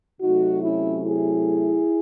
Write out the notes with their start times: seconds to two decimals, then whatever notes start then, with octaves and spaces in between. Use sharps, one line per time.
0.21 C3 F#3 A3 D#4 F#4
0.62 C#4 E4
1.03 E4 G#4